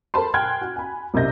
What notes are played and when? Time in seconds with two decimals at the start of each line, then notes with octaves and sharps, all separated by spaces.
0.14 A4 A#4 C5 A5 B5 C6
0.34 G5 G#5 C6 F6 F#6 G#6
0.61 F#4
0.76 G#5 B5
1.14 C2 C3 A#3 D#5 G6 A#6